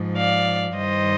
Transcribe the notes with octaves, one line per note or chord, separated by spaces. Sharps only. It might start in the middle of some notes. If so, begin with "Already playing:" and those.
Already playing: G#2 F3
D5 F5
G2 D#3 G3 C5 D#5